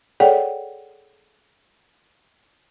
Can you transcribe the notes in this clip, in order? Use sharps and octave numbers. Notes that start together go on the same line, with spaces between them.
G#4 A4 C#5 D5 F#5 G5